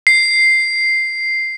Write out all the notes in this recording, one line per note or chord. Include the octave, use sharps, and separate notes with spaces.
C7